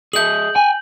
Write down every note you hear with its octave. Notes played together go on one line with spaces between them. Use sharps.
G#4 D#5 E5 G6 F#7
G5 G#5